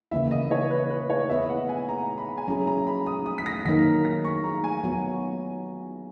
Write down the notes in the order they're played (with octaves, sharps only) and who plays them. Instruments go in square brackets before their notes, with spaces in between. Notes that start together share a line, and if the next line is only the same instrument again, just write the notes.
[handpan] C#3 E3 A#3 E4 [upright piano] E5
[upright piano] D#5
C#5
B4
B4
C#5
[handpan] B3 E4 B4 D#5 [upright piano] E5
[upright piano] F#5
G#5
A#5
B5
G#5
[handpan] F#3 C#4 E4 G#4 [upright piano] A#5
[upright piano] A#5
B5
D#6
D#6
B6
A#6
[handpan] D#3 F#3 A#3 D#4 A#4 [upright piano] B6
[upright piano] A#6
C#6
A#5
G#5
[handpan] F#3 B3 F#4